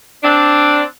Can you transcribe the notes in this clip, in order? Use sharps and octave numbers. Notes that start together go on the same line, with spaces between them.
C4 D4